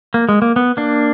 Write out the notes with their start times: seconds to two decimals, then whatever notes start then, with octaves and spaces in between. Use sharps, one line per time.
0.14 A#3
0.29 G#3
0.42 A#3
0.56 B3
0.77 A#3 D4